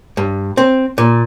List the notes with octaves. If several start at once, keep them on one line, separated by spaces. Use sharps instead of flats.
G2
C4
A#2